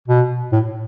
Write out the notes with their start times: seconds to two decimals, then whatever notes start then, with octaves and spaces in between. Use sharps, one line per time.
0.08 B2
0.52 A2